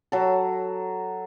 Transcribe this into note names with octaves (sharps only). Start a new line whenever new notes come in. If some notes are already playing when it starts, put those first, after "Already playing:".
F#3 A4